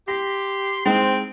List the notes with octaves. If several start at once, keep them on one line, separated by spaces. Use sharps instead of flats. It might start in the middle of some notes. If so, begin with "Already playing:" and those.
G4 C6 A#6
G#3 C4 D#4 C5